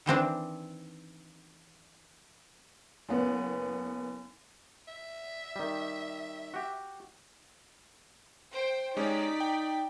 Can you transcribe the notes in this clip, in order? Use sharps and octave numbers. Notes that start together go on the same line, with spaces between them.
D#3 E3 C4 D4
F#1 B3
E5
D#3 G3
F#4 G4
C5 G5
G#3 C#4 D#4 G4 D5 B6
G5